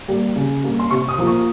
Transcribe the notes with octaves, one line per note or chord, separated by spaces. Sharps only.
G3 A#3
C#3
G3 A#3
C6
C3 C#6
D#6
F3 A#3
C#6